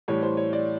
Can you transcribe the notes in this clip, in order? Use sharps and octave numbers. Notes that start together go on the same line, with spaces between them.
A2 E3 G3 C#5
C5
C#5
D5